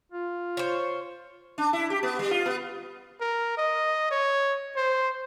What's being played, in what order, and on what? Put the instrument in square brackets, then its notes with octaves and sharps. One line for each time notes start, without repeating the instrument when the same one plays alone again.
[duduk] F4
[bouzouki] C5 C#5
[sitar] D4
E4
G4
B3
G3
F4
B3
[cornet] A#4
D#5
C#5
C5